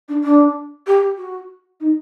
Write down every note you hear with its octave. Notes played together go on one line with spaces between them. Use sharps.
D4
D4
G4
F#4
D#4